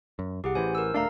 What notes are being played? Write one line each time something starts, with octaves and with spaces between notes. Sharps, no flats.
F#2
C2 G4 G#4 F#5
A1 E3 C5 G#5
A#4 E6
D#1 A3 D4 A#4 F5 A#5